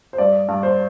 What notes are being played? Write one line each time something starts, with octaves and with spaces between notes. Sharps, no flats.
C5
G2 D5
G2
C5